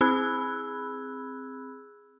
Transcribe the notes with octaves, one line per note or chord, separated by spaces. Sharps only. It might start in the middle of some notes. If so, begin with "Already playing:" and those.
C4 G#4 B5 E6 F#6 G#6